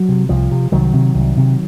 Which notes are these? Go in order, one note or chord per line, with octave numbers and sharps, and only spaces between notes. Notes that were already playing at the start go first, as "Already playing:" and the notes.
Already playing: F#3
C3
C2 F3
C3
C2 D#3 F#3
C3
C2
C3